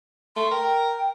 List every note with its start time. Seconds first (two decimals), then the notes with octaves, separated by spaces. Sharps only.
0.36 A3 C6
0.51 A#4 G5